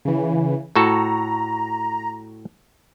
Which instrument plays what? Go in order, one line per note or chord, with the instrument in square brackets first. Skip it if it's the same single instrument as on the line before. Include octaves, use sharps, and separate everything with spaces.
[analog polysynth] C#3 E3
[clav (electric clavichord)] A2 F#4 A4 [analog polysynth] A#5